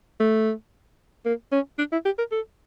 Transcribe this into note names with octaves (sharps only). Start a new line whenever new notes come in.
A3
A#3
C#4
D4
E4
G4
A#4
A4